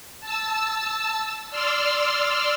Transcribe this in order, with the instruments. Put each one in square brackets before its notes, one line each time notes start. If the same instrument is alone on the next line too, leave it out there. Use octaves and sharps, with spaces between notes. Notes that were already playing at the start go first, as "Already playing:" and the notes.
[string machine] A5 E6
D5 C6 E6 F6